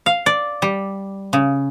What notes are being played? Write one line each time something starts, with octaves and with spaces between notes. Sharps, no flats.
F5
D5
G3
C#3